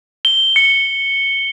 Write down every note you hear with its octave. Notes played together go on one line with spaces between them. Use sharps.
G7
C#7